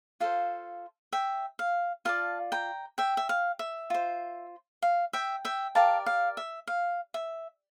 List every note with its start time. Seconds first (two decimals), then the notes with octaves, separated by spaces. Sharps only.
0.20 F4 A4 C5 F5
1.12 E5 G5
1.59 F5
2.05 F4 A4 D5 F5 A5
2.52 G5 A#5
2.98 E5 G5
3.17 E5
3.29 F5
3.59 E5
3.90 F4 C5
4.82 F5
5.13 E5 G5
5.45 E5 G5
5.75 G4 A#4 D5 F5 A5
6.06 F5
6.37 E5
6.67 F5
7.14 E5